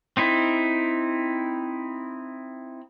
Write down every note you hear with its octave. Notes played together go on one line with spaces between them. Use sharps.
C4 D#4 E4